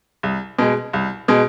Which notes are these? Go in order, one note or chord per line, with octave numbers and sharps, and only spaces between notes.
C2
B2 G#3
C2
B2 G#3